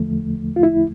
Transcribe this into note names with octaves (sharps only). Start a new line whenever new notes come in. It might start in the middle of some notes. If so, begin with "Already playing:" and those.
Already playing: E2 D3 F3 A3
F4
E4